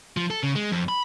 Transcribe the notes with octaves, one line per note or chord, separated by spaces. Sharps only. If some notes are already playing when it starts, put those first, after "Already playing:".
F3
A4
C#3
G#3
F2
B5